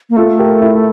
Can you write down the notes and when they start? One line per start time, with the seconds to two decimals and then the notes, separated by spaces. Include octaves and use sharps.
0.10 A#3
0.16 A3 F4 A4
0.39 G4 A#4
0.62 E4